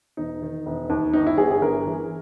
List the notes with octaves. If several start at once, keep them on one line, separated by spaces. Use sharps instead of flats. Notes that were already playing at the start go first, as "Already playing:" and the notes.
E1 D#4
D#3
E1
D#2
G1 D#4
E4
G1 G#4
G#4
G1 A#4
E3